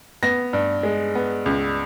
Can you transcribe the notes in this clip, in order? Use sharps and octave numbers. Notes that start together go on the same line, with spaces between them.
B3 A#6
G2
G#3
B3
C#2